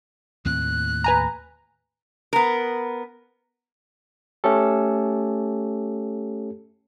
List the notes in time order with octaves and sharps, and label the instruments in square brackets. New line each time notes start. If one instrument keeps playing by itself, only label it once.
[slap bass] D#2 A2 C4 [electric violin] F#6
[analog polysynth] B4 G#5 A#5
[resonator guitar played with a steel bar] B3 A#4
[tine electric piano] A3 C#4 G4 A4